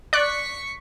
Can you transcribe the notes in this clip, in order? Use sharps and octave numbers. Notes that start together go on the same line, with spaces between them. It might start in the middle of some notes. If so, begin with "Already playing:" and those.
D5 C#6 F#6 B6 C#7